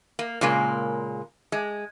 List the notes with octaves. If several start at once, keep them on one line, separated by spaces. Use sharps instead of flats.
A#3
A#2 C#3 G#3 A#3
G#3